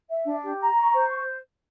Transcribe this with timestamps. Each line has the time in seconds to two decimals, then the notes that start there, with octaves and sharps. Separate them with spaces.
0.09 E5
0.25 D4
0.43 G4
0.60 A#5
0.77 C#6
0.95 C5